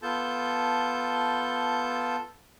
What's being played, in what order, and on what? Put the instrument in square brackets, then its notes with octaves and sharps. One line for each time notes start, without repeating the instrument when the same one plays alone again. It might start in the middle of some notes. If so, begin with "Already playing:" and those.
[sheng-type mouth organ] B3 F4 A4 A5 G6